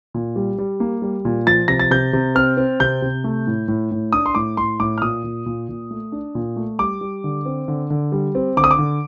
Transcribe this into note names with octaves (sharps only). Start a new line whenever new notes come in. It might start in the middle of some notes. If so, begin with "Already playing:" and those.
A#2
G3
G3
A#3
G3
A#2
F3 A6
C3 A#6
A6
C3 G6
C3
C4 F6
C4
C3 G6
C3
A3
A2
A2
A2
D4 D#6
C6
A2 D6
A2 C6
A2 D6
F6
A#2 D#6
A#2
A#2
A#2
A3
D4
A#2
A3
G3 D6
G3
D3
C4
D3
D3
G3
C4
D3 D6
D#6
D6
D3